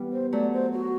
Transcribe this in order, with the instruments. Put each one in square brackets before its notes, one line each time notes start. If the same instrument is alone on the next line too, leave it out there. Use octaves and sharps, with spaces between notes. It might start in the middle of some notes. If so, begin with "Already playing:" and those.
Already playing: [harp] E3 G3 B3
[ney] C5
[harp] F#3 A3 [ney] D5
[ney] C5
F#4